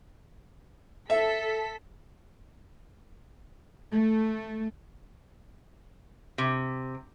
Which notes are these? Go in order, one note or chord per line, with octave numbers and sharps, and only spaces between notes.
A4 E5 B6
A3
C3